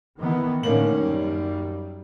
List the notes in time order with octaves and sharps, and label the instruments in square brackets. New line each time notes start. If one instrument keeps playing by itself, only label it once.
[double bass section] D#3 E3 B3
[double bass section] A2 D3 C#4 [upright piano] D#3 A#3 F#7
[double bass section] F#2 G3